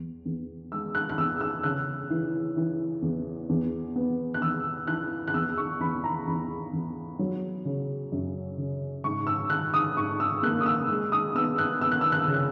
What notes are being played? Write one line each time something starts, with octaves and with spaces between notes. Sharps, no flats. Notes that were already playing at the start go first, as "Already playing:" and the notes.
Already playing: E2
E2
G#3 E6
F#6
F#6
E2 E6
E6
C#3 F#6
E3
E3
E2
E2
B3
F#6
E2 E6
E3 F#6
F#6
E2 E6
C#6
E2 B5
A#5
E2 B5
E2
F#3
C#3
F#2
C#3
G#2 C#6
E6
D#3 F#6
D#6
G#2 C#6
E6
A#3 F#6
D#6
E6
G#3
D#6
B3 E6
F#6
B3 E6
F#6
E6
F#6
C#3
F#6